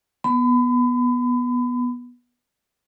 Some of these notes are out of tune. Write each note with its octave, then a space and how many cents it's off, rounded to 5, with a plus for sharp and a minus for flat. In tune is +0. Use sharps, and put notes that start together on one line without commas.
B3 -15 B5 +35